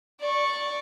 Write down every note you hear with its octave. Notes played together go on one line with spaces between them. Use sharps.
D5 C#6